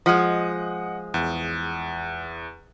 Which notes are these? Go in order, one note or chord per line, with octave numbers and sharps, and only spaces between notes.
F3 G#3 D#5 F#5 D#6
E2